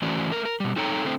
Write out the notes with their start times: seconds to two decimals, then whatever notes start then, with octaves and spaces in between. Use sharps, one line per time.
0.02 E3 A3 C#4 F#4 C5 D5
0.31 A3 A#4
0.45 A#4
0.60 B2 G3
0.76 C4 D#4 A4 C#5 G5 A#5
1.04 D3 A3 C4 C5